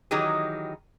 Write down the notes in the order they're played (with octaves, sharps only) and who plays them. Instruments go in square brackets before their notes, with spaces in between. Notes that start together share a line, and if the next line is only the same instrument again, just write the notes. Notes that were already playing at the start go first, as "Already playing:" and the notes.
[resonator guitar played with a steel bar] D#3 E3 F#3 D#4 G4 G#4